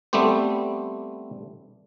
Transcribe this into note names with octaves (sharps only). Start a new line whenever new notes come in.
G3 A3 B3 C4 G4 C5